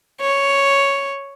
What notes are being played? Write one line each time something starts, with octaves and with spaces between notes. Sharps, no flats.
C#5